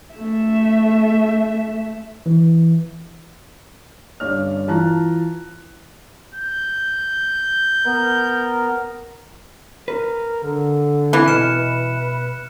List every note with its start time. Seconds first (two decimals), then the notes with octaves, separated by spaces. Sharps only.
0.14 A3 E5
2.26 E3
4.20 G1 G2 C#4 D5 F6
4.68 E3 F4 A5 A#5 F#6
6.35 G6
7.86 B3 A#4
9.88 A#4 B4
10.43 D3
11.13 E3 C4 A#4 G#5 F#6
11.28 B2 F6 C#7 E7
11.56 B4